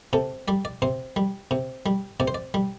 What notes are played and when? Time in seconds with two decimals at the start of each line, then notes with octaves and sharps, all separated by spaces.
0.13 C3 A4
0.48 G3 D5
0.65 D5
0.82 C3 C5
1.16 G3
1.51 C3
1.86 G3
2.20 C3 D5
2.28 C5
2.35 D5
2.54 G3